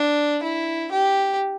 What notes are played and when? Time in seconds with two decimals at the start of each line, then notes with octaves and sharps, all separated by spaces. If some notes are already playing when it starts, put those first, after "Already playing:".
Already playing: D4
0.42 E4
0.92 G4